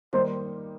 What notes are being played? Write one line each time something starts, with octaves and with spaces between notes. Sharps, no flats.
D#3 G3 A#3 D#4 C5